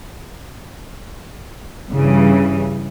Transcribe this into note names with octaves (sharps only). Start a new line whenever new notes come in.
G2 C#3 E3